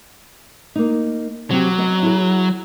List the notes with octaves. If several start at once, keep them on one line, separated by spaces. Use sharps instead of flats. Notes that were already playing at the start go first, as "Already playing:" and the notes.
A#3 D#4
C3 F#3 G4
B3 D#5
E4 G#4